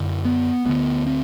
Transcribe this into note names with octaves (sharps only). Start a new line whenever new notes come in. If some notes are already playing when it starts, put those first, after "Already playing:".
Already playing: F#2 D3
B3
D2 D3 B3
C4